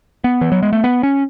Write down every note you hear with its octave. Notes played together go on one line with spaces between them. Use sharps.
B3
E3
F#3
G#3
A3
B3
C#4